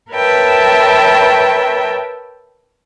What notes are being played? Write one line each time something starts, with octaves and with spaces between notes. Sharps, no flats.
A#4 B4 C#5 E5 G5 A5